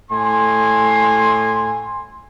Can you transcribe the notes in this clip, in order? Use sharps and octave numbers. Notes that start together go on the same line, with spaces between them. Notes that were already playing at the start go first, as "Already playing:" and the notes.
A2 G#5 C6